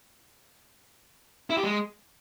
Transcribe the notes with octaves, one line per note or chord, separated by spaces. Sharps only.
E4
G4
G#3